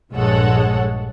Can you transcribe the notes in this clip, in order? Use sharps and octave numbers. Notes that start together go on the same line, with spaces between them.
A#1 G2 G#3 A4 C#5 F#5